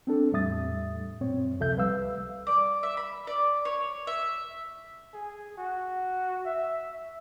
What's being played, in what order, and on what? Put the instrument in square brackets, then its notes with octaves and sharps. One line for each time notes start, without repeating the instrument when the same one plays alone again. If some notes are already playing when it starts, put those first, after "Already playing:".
[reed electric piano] C4 D4 A4
E2 A2 G3 E5 D#6 A6
F#2 A#2 C4 C#5
C#2 C3 F3 A4 E5 G6
C2 G3 B4 F5 E6
[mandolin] D5
E5
B5
D5
C#5
E5
[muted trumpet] G#4
F#4
E5